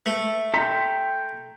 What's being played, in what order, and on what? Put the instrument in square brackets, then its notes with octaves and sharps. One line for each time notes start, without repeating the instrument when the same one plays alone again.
[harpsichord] A3
[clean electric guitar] A4 A#5 C6 [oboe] G5 [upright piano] B6